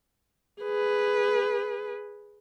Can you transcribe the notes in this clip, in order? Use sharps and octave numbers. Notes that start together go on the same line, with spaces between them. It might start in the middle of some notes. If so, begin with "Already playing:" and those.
G#4 B4